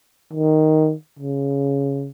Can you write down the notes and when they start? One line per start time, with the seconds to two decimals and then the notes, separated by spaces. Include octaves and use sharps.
0.34 D#3
1.19 C#3